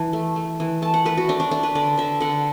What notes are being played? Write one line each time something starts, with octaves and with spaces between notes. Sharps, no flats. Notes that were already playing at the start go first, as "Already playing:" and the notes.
Already playing: E3 A5
A3
A3
E3
A3 A5
F#5
A3 B4
F#4
A3 D4
D4
A3 D4
B4
D3 D5
D3 E5
D3 F#5